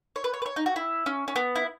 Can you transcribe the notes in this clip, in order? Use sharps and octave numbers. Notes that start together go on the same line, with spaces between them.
C#5
B4
C#5
B4
C#5
D#4
F#4
E4
C#4
C#4
B3
E4